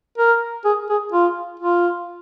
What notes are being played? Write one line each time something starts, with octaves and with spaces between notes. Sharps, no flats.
A#4
G#4
G#4
F4
F4